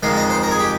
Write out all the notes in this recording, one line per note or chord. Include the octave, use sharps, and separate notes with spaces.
F2 D#3 G#3 F5
D#5
C5
A#4
G#4
G4